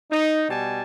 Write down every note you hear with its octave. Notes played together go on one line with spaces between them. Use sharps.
D#4
B2 G3 G#5 A5